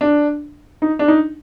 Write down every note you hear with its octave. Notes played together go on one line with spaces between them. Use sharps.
D4
D#4
D4
D#4